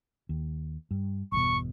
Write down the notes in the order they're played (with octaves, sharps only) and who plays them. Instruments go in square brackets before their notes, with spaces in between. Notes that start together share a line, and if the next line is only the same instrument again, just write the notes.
[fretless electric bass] D#2
G2
[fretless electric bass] G1 E2 B2 [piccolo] C#6